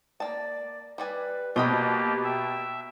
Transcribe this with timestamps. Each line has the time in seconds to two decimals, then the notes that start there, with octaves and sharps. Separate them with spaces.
0.20 A#3 D5 A5
0.98 G3 B4 D5 G#5
1.56 B2 A#3 F#4 G4 C5 D#5 B5
2.24 E5 G5